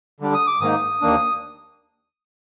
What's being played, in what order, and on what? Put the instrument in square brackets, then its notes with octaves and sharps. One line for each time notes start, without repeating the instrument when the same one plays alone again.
[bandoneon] D3 G3 D4
D#6
D6
G#2 D#3 A#3 D#4 D#6
D#2 D#3 A#3 D4